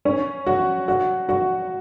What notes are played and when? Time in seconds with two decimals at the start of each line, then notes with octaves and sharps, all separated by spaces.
0.05 C#4
0.46 F#4
0.88 F#4
1.29 F#4